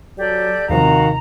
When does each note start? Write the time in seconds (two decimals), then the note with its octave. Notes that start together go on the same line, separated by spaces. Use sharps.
0.18 F#3 G4 A4 D5
0.69 D#2 C3 D#3 F3 F#4 F5 A#5